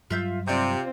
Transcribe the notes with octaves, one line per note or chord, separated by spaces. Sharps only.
G2 F#3 G3 F4 E5 G6
C3 C4 F4 D5 G6